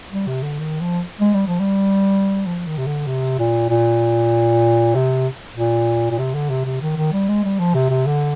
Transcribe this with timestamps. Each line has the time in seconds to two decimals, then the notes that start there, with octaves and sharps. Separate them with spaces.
0.12 G3
0.27 C3
0.43 D3
0.59 D#3
0.80 F3
1.20 G#3
1.34 G3
1.47 F3
1.60 G3
2.46 F3
2.67 D#3
2.78 C3
2.87 D3
3.07 C3
3.39 A#2
3.70 A#2
4.95 C3
5.57 A#2
6.11 A#2
6.18 C3
6.34 D3
6.50 C3
6.65 C3
6.82 D#3
6.97 D#3
7.13 G3
7.29 G#3
7.44 G3
7.59 F3
7.74 C3
7.90 C3
8.06 D3